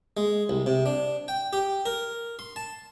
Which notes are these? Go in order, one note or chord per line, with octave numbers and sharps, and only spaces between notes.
G#3
C2
C3
D4
G5
G4
A#4
C6
A5